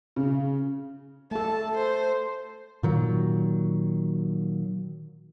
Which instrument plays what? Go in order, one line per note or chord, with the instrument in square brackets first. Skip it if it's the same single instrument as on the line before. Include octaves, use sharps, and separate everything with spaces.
[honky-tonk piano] C#3
[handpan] A3 A4 [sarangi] A5
[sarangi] C5
[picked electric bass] A#2 D#3 F#3